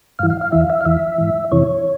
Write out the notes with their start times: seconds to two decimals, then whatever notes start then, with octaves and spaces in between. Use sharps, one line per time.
0.19 G2 E3 F5
0.30 F5
0.41 F5
0.52 E2 E3 E5
0.61 F5
0.70 E5
0.81 F5
0.85 E2 E3 E5
1.18 G#2 E3
1.51 F2 C3 E3 C#5